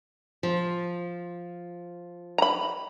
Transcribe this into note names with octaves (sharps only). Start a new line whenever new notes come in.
F3
A#5 B5